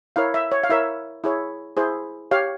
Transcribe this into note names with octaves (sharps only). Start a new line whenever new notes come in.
E4 A#4 C#5 F5
E5
C#5
F5
E4 A#4 C#5 E5
E4 G#4 C#5
E4 G#4 C5
G4 C#5 F5